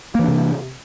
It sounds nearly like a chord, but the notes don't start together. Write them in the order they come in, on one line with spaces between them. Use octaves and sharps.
A#3 E3 D4 C3